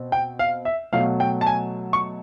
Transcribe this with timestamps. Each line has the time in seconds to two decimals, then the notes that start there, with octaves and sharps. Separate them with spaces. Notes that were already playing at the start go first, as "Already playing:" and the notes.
Already playing: B2 C4
0.12 G5
0.39 F5
0.65 E5
0.92 B2 F#3 A3 F5
1.20 G5
1.41 A5
1.47 G#5
1.93 C#6